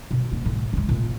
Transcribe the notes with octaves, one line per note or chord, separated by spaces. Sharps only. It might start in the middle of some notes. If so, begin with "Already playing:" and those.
B2
A#3
A2
C#3 G#3
A#2